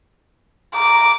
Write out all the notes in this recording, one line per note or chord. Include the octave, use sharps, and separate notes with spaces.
A#5 D6